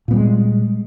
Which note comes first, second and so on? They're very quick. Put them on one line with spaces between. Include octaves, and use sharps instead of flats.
A#2 B3 G3 G#3